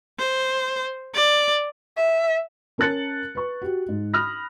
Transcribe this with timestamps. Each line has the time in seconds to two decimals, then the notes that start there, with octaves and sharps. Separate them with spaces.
0.19 C5
1.14 D5
1.97 E5
2.78 C#4 A#4 A5 F#6 A6 C#7
3.35 B4 C#6
3.62 F#4 G4
3.89 G#2
4.14 B5 D#6 F6 F#6 A#6